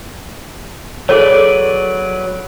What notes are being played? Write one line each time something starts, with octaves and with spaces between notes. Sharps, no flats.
F#3 G#4 A4 B4 C#5 D5